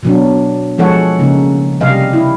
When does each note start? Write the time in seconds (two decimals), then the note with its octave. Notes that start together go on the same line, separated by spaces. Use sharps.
0.03 B2 F#3 D4
0.78 F3 G#3 A4 C#5 F#5
1.19 C#3 A#3 D#4
1.80 C3 G3 D#5 F5
2.13 E4